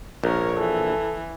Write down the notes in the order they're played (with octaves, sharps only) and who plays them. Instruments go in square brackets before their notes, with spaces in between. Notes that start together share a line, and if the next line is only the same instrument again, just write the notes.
[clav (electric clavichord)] A#1 [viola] A#4 C#5
[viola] E3 [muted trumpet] A4